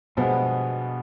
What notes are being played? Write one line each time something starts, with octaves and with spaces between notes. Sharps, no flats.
G2 B2 F3 G#3 B3